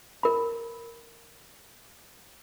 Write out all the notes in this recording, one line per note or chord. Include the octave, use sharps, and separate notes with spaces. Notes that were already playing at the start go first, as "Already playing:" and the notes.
A#4 B5